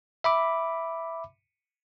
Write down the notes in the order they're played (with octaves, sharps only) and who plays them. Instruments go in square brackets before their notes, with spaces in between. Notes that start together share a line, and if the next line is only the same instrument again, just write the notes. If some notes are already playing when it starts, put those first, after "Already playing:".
[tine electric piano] E5 B5 D6